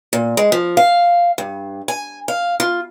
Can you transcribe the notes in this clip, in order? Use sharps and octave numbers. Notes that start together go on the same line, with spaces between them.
A#2
G#3
F3
F5
G2
G#5
F5
F4